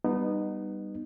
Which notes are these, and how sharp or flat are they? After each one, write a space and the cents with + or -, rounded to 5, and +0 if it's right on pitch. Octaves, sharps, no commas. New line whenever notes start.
G3 +0 B3 +0 D#4 -25